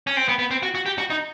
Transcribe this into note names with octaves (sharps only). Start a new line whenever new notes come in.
C#4
C4
B3
B3
C4
F#4
F#4
G4
F#4
D#4